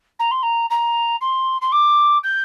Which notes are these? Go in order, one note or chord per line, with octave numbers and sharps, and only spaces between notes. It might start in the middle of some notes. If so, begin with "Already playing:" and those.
A#5
C6
A#5
A#5
C6
C6
D6
G6